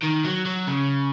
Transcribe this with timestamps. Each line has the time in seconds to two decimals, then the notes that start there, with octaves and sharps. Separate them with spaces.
0.02 D#3
0.25 F#3
0.46 F#3
0.67 C#3